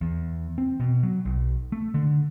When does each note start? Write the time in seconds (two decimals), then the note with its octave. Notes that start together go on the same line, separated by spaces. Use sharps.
0.01 E2
0.58 C4
0.80 B2
1.03 F#3
1.25 B1
1.72 A3
1.94 D3